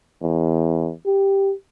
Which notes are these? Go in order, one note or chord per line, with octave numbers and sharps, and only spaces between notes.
E2
G4